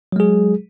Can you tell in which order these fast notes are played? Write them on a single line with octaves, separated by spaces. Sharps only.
F#3 G#3 G#4